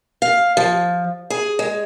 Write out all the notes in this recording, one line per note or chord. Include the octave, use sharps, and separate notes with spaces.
F5
F3
G#4
G#3